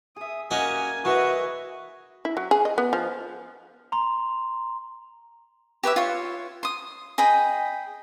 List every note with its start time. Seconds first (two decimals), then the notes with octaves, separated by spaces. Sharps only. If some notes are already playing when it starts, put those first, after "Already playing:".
0.16 G#4 E5 D#6
0.51 A#3 C#4 F#4 D#5 G#5
1.05 E3 E4 F#4 D#5 E5
2.25 E4
2.37 F#3
2.51 G#4
2.65 D#5
2.78 B3
2.93 F3
3.92 A#5 C6
5.83 G4 B4 C#5 E5
5.96 F4 C#5
6.63 C6 D#6
7.18 G#4 D#5 G5 B5